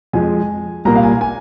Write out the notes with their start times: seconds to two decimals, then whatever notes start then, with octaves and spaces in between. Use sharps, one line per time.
0.13 F2 F3 G#3 G#5
0.85 C2 A#2 A#3 A#5
0.96 F5
1.03 G#5
1.21 G#5